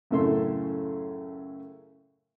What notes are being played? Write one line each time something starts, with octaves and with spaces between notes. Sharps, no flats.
F#2 A2 C#3 A4 E5 C6